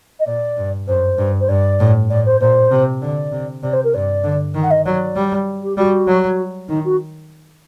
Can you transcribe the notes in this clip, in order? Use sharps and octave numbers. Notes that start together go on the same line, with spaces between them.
D#5
A#2 D5
G2
F#2 C5
G2
C5
G2 D5
A2
A2 D5
C5
A#2 C5
C3
D3 D5
C3
C3 D5
C5
A#4
G2 D5
D3
D#3
F#5
D#5
F#3 D5
G3
G4
G3 F#4
F#3
D#3 D#4
F#4